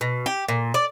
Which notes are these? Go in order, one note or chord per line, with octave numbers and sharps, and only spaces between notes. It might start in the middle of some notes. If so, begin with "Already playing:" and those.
B2
G4
A#2
D5